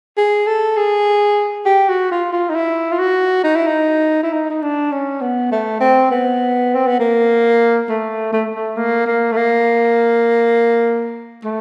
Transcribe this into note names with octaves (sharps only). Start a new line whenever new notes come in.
G#4
A4
G#4
G4
F#4
F4
F4
D#4
E4
F4
F#4
D#4
E4
D#4
E4
D#4
D#4
D4
C#4
B3
A3
C4
B3
C4
B3
A#3
A3
A3
A3
A#3
A#3
A3
A#3
A3